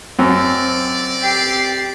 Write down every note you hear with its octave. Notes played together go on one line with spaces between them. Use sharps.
F#2 C4 D5
G4 C7